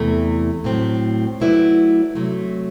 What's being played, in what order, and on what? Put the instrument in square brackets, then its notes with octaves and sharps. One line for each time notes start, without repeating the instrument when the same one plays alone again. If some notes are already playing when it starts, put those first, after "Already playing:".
Already playing: [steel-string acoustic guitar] E2 C3 E3 A3
A2 F#3 A3 C4
F#3 A3 E4 B4 D5
C3 F#3 A3